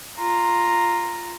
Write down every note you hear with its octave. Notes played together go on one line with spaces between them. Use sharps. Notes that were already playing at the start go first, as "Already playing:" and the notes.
F4 A#5